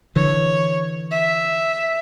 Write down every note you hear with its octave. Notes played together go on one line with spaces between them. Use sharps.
D3 E3 C#5
E5